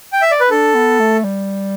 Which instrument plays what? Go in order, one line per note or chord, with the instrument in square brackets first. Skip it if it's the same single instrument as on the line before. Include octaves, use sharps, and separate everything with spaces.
[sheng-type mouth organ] G5
E5
D5
B4
[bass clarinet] D4 [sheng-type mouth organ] A4
[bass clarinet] B3
A3
G3